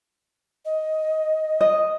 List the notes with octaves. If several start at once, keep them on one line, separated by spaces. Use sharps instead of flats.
D#5
D#5